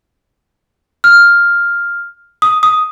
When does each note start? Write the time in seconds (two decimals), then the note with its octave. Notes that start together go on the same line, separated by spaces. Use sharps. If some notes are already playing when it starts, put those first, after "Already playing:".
1.04 F6
2.42 D#6
2.63 D#6